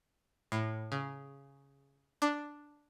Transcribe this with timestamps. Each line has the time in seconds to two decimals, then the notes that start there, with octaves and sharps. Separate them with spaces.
0.52 A2
0.92 C#3
2.22 D4